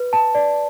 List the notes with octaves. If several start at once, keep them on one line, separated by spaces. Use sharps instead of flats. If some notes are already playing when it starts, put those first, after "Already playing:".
Already playing: B4
A5
D5